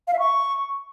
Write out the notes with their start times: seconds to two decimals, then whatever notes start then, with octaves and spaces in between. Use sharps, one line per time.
0.08 F5
0.13 E5
0.19 C#6